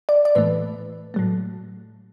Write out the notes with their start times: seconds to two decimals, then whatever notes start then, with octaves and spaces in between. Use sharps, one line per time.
0.09 D5
0.25 D5
0.35 A2 E3 A3 B4
1.14 A2 F#3 A3